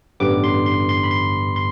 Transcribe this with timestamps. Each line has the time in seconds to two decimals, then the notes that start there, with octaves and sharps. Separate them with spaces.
0.20 A1 G2 D3 G3 B3 D6
0.44 C6
0.66 C6
0.89 C6
1.03 B5
1.11 C6
1.56 C6